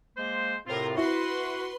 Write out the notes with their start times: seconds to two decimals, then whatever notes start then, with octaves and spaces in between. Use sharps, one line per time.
0.17 G#3 A#3 C5
0.67 A2 C3 C4 F4 A#4
0.97 E4 F#4 B4 C6